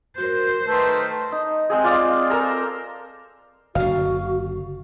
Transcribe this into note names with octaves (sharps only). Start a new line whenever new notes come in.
F#4 A#4 C5
D#3 A3 A4 B4 C6
D#4
G#3 C4 G#4
F4 D5 F5
A4 A#4 C5 A#5
F#1 D3 F#4 F5